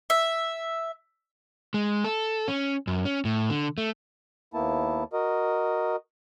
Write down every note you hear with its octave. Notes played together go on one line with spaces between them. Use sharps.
E5
G#3
A4
C#4
F#2
C#4
A2
D3
A3
D#2 A#3 B3 E4 A5
F#4 A#4 D#5